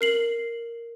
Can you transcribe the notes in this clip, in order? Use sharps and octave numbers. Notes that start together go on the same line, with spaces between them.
A#4 C7 F#7